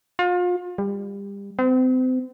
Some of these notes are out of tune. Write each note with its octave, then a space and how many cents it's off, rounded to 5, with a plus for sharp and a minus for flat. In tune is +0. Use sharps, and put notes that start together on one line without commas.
F4 +35
G3 +30
C4 -35